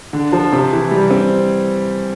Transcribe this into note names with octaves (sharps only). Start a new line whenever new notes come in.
D3
F3
C3
E3
G3
C4